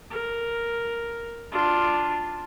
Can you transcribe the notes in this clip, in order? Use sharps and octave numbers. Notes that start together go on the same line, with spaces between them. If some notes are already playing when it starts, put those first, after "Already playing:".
A#4
D4 F4